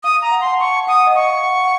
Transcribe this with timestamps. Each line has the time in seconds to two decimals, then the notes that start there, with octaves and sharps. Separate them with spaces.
0.03 F5 D#6
0.22 A#5
0.31 F#5
0.41 C6
0.46 A5
0.60 A5 C#6
0.87 F#5 D#6
1.07 D#5
1.15 F5 C#6
1.43 F#5